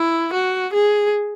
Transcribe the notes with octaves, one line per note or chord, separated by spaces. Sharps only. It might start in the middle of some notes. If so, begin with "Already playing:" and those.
Already playing: E4
F#4
G#4